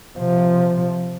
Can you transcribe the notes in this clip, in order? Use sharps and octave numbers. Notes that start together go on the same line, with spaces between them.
C3 F3